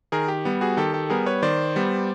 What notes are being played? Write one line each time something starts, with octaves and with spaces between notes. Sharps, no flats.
D#3 G#4 A#4
G4
G3 B3
F#4 G#4
D#3 G4 A4
G4 A4
G3 B3 G#4 A#4
B4 C#5
D#3 C5 D5
G3 B3